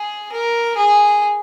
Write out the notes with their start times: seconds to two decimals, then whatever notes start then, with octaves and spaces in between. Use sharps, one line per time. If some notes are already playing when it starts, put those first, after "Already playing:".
Already playing: G#4
0.32 A#4
0.77 G#4